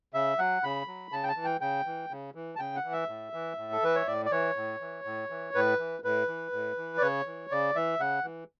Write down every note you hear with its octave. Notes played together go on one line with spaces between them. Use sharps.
C#3 E5
F#3 F#5
C#3 B5
F#3
C#3 A5
G5
A5
E3
G5
C#3 G5
E3
C#3
E3
A5
C#3 G5
F#5
E3
E5
A2
E3
A2
A4
E3 B4
C#5
A2 D5
D5
E3 C#5
A2
E3
A2
E3
A2 B4
E3
A2 B4
E3
A2
E3
D5
C#3 C#5
E3
C#3 D5
E3 E5
C#3 F#5
E3